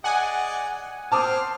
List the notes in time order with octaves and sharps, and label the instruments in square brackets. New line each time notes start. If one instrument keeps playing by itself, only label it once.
[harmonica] G#4 D5 D#5 [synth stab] F#5 G#5
[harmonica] C4 F6 [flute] C5 [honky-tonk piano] A5 D6 D#6